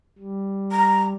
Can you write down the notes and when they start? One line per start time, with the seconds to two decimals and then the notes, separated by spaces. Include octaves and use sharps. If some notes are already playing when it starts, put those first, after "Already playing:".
0.18 G3
0.72 A#5